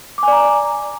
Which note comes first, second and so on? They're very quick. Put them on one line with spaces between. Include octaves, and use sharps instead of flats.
D6 G#5 D5 A#5